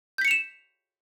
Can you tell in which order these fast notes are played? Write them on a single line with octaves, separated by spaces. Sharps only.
G6 B6 C#7 F7 E7